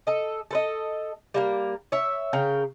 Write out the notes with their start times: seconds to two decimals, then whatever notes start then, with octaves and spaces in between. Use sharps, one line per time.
0.07 A4 D#5
0.51 A4 B4 D#5
1.34 G3 A#3 A#4
1.92 C#5 E5
2.33 C#3 A#4 G5